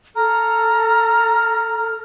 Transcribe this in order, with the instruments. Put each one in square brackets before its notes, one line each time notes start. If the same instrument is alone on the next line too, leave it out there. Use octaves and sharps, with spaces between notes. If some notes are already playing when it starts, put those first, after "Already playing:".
[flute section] A4 F6 [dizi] A#5